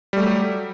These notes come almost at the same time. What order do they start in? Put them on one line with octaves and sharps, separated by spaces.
G3 A3 G4 F#3